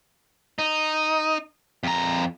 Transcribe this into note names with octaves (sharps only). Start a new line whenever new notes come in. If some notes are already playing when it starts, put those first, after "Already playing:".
D#4
F2 A#5